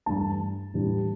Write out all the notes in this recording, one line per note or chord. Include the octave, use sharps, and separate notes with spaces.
G2 E3 A3 D4 A5
A2 E3 G3 D4